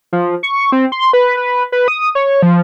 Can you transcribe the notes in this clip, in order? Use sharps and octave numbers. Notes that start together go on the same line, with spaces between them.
F3
C#6
C4
C6
B4
B4
B4
D#6
C#5
F3